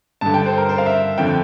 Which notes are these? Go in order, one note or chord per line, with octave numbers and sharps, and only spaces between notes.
G2 D3 A5
G5
C5
A#4
C5
F5
E5
F2 D3 G5